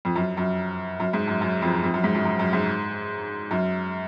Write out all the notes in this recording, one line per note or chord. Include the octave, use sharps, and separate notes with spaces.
F2
F#2
F#2
F#2
G#2
F#2
F#2
F2
F2
F#2
G#2
F#2
F#2
F#2
G#2
F#2